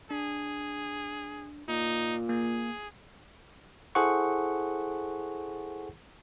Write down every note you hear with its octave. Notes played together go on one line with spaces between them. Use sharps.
D4 G#4
A#2 D#4
A#3 G#4
E4 G#4 A4 C5 F#5 C#6